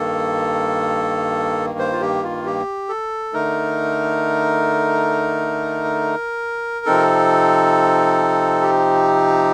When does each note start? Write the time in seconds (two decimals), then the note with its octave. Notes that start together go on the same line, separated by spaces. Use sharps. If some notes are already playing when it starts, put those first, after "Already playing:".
Already playing: G2 D#3 A#3 A4
1.79 C5
1.93 F4
2.01 G4
2.24 F4
2.45 G4
2.89 A4
3.33 D3 A3 D#4 A#4
6.86 C3 F3 C4 D#4 A4
8.62 G4